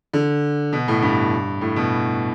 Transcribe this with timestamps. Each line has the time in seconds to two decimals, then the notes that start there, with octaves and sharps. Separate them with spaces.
0.13 D3
0.73 B2
0.88 A2
1.02 G2
1.61 A2
1.76 B2